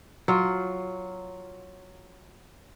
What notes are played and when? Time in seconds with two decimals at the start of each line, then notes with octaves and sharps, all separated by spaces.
0.28 F#3 F4